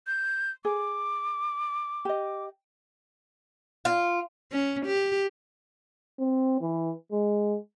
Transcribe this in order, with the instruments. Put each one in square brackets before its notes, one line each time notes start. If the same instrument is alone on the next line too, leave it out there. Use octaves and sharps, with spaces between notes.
[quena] G6
[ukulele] G#4 [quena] D6
[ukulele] G4 D#5
[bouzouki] F4
[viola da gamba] C#4
G4
[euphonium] C4
E3
G#3